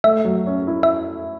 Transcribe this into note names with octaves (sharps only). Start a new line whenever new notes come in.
A3 E5
F#3
C#4
E4
E5